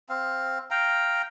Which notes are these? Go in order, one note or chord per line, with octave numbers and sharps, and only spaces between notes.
C4 F5
F5 G5 A#5